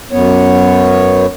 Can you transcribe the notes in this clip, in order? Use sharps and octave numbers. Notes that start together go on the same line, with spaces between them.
F#2 B3 C#5